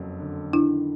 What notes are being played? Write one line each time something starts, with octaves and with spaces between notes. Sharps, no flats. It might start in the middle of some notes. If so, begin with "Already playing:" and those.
Already playing: F#1 F2 F#3
D3
D#3 D4 E4